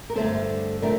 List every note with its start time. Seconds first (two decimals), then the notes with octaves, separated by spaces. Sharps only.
0.10 A#4
0.15 G2 D3 A3 C4 A4 C5
0.82 D3 F3 A3 C4 A#4 D5